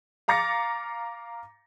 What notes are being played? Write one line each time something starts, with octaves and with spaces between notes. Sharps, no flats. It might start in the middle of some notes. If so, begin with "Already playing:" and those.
F5 A#5 D6 A6 A#6 C#7